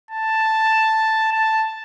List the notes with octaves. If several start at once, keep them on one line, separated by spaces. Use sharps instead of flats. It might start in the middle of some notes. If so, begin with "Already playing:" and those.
A5
A5